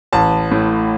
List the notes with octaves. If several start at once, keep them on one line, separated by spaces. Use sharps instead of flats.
A1 A5
A2